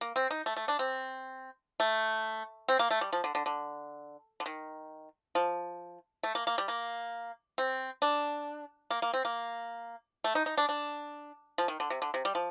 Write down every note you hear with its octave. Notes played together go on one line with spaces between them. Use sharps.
A#3
C4
D#4
A3
A3
D4
C4
A3
C4
A#3
A3
G3
F3
D3
D3
D3
D3
D#3
F3
A3
A#3
A#3
G3
A#3
C4
D4
A#3
A#3
C4
A#3
A3
D#4
D#4
D4
D4
F3
D#3
D3
C3
D3
C3
G3
F3